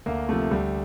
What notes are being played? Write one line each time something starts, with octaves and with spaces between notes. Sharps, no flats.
D2 A#3
C3 F3 A3
D2 G3